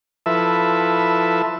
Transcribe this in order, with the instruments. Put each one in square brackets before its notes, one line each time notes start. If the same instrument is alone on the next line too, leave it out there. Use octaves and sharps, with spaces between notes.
[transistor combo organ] F3 E4 A4 B4 E5